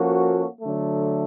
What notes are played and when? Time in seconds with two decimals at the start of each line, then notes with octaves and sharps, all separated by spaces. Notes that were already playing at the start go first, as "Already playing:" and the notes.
Already playing: F3 A#3 C#4 F#4 A4
0.61 D3 F#3 A3